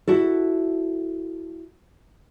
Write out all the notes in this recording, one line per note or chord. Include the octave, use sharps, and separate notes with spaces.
E4 F#4 A4